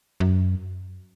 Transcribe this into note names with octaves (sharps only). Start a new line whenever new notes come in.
F#2